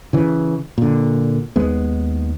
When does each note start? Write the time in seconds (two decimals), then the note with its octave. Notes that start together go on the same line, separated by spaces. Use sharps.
0.13 C#3 E3
0.78 A#2 D3
1.56 D#2 G#3 B3